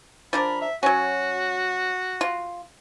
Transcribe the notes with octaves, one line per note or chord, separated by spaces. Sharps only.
F3 D4 A#4 B5
E5
F#3 C#4 F#4
F4